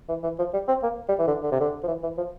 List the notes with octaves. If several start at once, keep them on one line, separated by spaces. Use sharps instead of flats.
E3
E3
F3
G3
C4
A#3
G3
E3
D3
D3
C3
D3
F3
E3
E3
F3